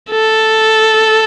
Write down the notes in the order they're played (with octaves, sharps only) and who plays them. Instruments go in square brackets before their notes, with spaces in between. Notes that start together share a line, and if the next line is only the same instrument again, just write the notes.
[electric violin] A4